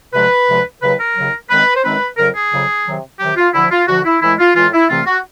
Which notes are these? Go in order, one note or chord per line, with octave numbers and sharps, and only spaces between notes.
D2 C3 F3 G#3 B4
D2 C3 F3 G#3
D#2 C#3 F#3 B4
A#4
D#2 C#3 F#3
F#2 D#3 G#3 C4 D#4 B4
C5
F#2 D#3 G#3 C4 D#4 B4
F2 C#3 F#3 A#4
G#4
F2 C#3 F#3
C3 D#3 F#3
C3 D#3 F#3 G4
F4
D2 D3 F3 E4
F4
D2 D3 F3 F#4
E4
A2 E3 G#3 E4
F4
A2 E3 G#3 F4
E4
C2 C3 E3 A3 C4 F4
F#4